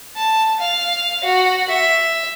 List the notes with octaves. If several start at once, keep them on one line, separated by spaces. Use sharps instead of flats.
A5
F5
F#4
E5